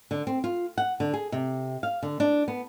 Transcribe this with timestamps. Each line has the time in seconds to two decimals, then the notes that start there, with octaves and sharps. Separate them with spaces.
0.11 D3
0.27 C4
0.44 F4
0.78 F#5
1.00 D3
1.13 G#4
1.32 C3
1.83 F5
2.03 D3
2.20 D4
2.48 B3